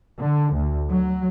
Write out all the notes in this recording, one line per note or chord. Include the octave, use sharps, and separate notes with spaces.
D3
D2
F#3